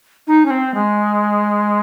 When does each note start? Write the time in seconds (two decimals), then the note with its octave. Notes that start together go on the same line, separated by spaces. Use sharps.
0.27 D#4
0.46 C#4
0.50 C4
0.74 G#3